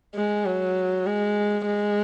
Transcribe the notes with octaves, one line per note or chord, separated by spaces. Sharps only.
G#3
F#3
G#3
G#3